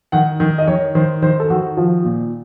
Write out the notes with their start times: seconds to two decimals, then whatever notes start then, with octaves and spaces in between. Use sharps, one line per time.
0.12 D#3 F#5
0.40 D#3
0.58 D#5
0.67 D#3 C#5
0.95 D#3 C5
1.22 D#3 C5
1.40 A4
1.50 D#3 F#4
1.77 F3
2.04 A#2